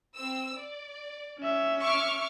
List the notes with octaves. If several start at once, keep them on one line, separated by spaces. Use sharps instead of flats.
C4 E6
D5
C#4 E5
C#6 D6 F6